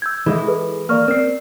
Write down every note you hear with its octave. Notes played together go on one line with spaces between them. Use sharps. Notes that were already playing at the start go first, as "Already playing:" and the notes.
E6 G6 G#6
E3 G#3 E4 A4
G#4 A4 B4
A#3 D5 C#6 F6
C4 A#4 D5 C7